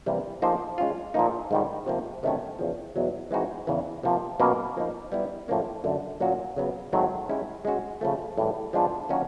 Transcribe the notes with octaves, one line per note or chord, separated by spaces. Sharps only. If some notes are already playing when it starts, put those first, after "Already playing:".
C3 E3 G3 A#3
F3 A#3 D#4 G#4 C5
G#3 C#4 F4
A#2 F3 A#3 D#4
G#2 D#3 G3
C3 F3 A#3
C3 D#3 F#3 A3 C#4
E2 C#3 F3
E2 B2 F#3
E3 G#3 C4 D#4 F#4
E2 C#3 E3
C3 F3 A#3
B2 F#3 A#3 C#4
F3 A#3 D#4
G3 B3 E4
A2 F3 A#3 C#4
F#2 D3 F#3 A3
A#2 F#3 A#3 C#4 F#4
C#3 F#3 B3
G#2 D#3 F#3 A3 C4
G#3 C#4 E4 G4
G#3 C#4 F#4
C#3 F3 A3
A2 E3 G3
F3 G#3 B3 D4 F4
D#3 F#3 A#3 C#4 F#4